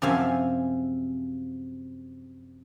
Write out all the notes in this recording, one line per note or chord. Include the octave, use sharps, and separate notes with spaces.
F#2 C3 F3 E5 F5 G#5